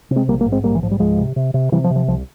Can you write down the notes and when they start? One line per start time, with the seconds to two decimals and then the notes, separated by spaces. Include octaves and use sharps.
0.11 C3
0.16 G#3 C4
0.28 A#1 G3 A#3
0.40 G3 A#3
0.46 G#2
0.52 G#3 C4
0.64 A#1 G3 A#3
0.75 E3
0.83 G#2 F3
0.91 G3
0.99 C#2 F3 G#3
1.18 C3
1.36 C3
1.54 C3
1.72 C3 E3 G3
1.84 F3
1.90 C3
1.96 F3
2.08 C2 F3